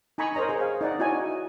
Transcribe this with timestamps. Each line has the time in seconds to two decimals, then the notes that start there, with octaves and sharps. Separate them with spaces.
0.18 D#4 G#5 A#5 B5 C#6 D#6
0.35 A#4 C5 C#5 D#5 A#5
0.49 G#4 C#5
0.61 F5
0.81 D#4 D5 F#5
0.99 D#4 E4 F#4 C#5 D#5 G#5